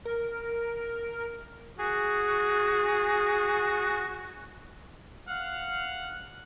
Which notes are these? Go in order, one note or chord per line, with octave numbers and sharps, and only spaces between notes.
A#4
F#4 G#4
F5 F#5 F6